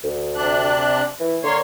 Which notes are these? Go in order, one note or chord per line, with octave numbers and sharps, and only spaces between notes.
D2
C3 D4 F#6
E3
D3 A#3 C#5 C6